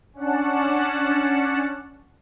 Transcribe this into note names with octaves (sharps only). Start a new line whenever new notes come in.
C#4 D4 F#5 A5